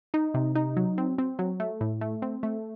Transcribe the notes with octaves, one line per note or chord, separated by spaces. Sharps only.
D#4
C3
D#4
F#3
C4
C4
F#3
A3
A2
A3
C4
A3